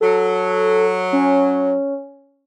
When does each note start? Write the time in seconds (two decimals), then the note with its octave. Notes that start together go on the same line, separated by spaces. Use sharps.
0.01 F#3 A4
1.13 C#4